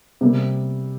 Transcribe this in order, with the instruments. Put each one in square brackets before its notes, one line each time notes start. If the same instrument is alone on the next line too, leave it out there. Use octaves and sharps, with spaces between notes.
[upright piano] C3 G3 A#3